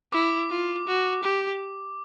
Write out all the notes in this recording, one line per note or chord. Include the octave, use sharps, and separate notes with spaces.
E4 D6
F4
F#4
G4